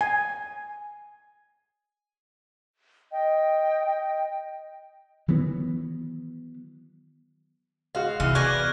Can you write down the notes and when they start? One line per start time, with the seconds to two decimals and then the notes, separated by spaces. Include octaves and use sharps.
0.01 G#5
3.11 D#5 G5
5.28 D#3 E3 F#3 B3
7.95 G#3 F#4 F5
8.20 C3 E3 D#4 F6
8.35 B3 G#4 D5 C#6 F#6 G#6 A#6